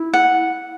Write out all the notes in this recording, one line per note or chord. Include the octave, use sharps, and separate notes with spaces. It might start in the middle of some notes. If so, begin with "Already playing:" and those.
Already playing: E4
F#5